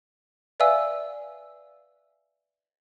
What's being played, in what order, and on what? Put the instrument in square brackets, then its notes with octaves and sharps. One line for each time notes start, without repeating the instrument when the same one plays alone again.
[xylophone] B4 D5 E5 F5 G#5 E6